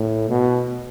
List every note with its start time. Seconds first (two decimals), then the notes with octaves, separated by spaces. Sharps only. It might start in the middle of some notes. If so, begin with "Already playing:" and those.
Already playing: A2
0.29 B2